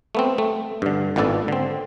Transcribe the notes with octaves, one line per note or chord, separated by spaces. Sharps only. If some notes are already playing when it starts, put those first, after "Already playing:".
A3 B3 C4
A3
G2 D3
G#1 A#2 B3 D4 A4 D5
D3 C4